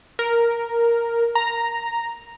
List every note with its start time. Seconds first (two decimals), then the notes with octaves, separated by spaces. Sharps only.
0.19 A#4
1.35 A#5